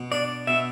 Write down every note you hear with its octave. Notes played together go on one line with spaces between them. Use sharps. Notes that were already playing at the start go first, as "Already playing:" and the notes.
Already playing: B2
D4 D5
B2 E5